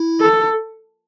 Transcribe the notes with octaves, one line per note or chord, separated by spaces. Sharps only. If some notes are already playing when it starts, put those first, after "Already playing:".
Already playing: E4
A4